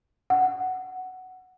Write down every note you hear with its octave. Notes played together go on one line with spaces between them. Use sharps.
F#5